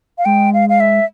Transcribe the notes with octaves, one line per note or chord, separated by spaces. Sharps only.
F5
G#3 G5
F5
F5
E5